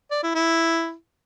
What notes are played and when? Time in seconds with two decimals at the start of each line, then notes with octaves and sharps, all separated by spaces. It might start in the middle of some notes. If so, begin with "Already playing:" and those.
0.11 D5
0.23 E4
0.35 E4